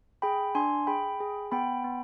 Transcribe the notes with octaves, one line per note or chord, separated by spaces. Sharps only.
G#4 G5 B5
D4 G#5 C6
G#4 G5 B5
G#4
B3 G5 B5
B3